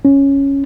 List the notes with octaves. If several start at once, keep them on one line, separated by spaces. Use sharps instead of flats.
C#4